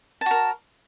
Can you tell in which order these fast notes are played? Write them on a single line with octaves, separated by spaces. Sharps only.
A5 F#4 A#4